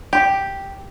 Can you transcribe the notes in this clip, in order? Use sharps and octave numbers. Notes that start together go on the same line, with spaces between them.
G4